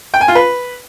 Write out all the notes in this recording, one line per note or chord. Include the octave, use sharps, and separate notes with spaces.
G5
G#5
F4
B4